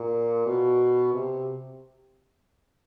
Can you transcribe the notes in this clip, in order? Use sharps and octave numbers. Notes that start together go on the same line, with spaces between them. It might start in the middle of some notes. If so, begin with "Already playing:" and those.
Already playing: A#2
B2
C3